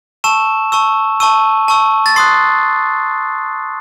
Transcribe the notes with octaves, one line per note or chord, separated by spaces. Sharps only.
A5 C#6 E6 E7
A5 C#6 E6
A5 C#6 E6 D#7
A5 C#6 E6
A6
C6 D#6 F#6 C7